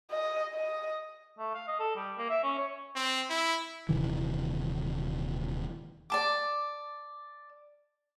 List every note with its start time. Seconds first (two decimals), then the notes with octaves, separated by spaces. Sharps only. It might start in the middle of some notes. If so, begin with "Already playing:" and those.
0.11 D#5
0.54 D#5
1.39 A3
1.54 F5
1.68 D#5
1.80 A4
1.96 G3
2.18 A#3
2.30 E5
2.43 C#4
2.58 C#5
2.95 C4
3.30 E4
3.89 D#1 C3 D#3 E3
6.10 D5 A5 D6